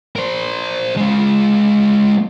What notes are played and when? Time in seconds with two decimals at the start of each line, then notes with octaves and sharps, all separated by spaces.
0.16 A#4 C5
0.97 G#3 F4